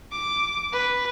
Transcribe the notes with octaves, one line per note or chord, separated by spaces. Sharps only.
D6
B4